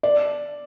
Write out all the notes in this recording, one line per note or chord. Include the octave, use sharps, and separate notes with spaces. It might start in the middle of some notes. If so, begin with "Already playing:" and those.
D5